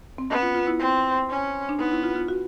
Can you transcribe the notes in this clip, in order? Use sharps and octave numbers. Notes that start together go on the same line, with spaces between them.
C4
B3 C#4
F4
F4
E4
C4
C#4
D4
B3 D#4
E4
F4
F4
F#4